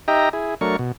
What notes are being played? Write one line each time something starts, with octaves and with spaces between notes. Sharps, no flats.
D#4 G4 D#5 E5 G5 A#5
E4 G#4
F#3 A3 D4 A#4 C#6
B2